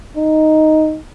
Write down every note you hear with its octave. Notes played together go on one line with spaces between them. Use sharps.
D#4